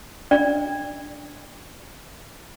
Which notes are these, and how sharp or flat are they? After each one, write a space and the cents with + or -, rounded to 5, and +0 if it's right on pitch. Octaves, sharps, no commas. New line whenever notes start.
D4 +0 D5 +0